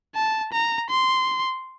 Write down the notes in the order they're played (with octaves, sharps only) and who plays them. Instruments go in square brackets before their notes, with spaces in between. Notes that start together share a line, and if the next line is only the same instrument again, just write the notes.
[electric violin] A5
A#5
C6